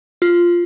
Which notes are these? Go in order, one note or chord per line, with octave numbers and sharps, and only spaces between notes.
F4